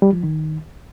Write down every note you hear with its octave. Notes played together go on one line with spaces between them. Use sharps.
G3
F3
D#3